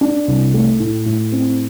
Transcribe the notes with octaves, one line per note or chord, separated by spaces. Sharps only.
D4
C2
A3
A2
A2
C4